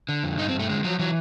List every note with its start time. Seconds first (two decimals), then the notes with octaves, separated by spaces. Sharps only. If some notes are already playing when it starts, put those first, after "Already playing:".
0.09 D3
0.24 F2
0.38 G2 D#4
0.48 C4
0.54 G2
0.59 A3
0.69 D3 G#3
0.84 F3 F#3
0.99 E3 F#3